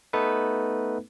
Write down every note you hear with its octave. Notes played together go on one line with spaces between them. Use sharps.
A3 B3 D#4 A4 B4